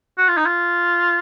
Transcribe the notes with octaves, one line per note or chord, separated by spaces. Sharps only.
F#4
F4
D#4
F4